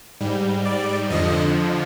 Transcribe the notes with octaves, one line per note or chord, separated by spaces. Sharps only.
G#2 G3
D5
F2 D3 F3 D#5